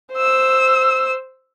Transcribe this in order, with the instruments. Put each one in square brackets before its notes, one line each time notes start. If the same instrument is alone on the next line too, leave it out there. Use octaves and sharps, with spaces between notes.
[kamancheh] C5 E6